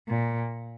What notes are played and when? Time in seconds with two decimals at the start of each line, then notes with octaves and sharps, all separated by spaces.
0.09 A#2